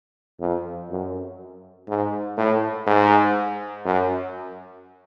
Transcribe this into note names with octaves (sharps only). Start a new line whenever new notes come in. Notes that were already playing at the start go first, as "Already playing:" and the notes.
F2
F#2
G#2
A2
G#2
F#2